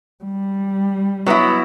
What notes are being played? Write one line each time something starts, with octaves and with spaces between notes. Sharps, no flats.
G3
F#3 B3 E4